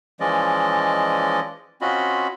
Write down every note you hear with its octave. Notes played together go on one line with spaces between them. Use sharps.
E3 F3 G#3 C#4 D5 D#5
C4 C#4 F4 F#4 D#5 B5